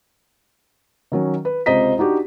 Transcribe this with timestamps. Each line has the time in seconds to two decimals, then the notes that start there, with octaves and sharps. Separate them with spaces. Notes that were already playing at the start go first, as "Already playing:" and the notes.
1.12 D#3 F#3 C#4
1.45 B4
1.66 C#2 C3 C5 D#5 A#5 B6
1.98 D4 D#4 F#4 G4